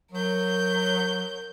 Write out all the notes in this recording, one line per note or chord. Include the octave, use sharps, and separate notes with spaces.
F#3 A#4 G6